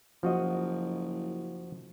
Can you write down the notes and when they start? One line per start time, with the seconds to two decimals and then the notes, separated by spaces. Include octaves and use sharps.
0.23 F#1 F3 F#4 D#5